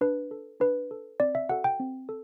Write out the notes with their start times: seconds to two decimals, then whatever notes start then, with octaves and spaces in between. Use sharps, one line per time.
0.01 D4 B4
0.31 A4
0.60 D4 B4
0.91 A4
1.20 C4 D5
1.35 E5
1.49 F#4 A4 F#5
1.64 G5
1.80 C4
2.09 A4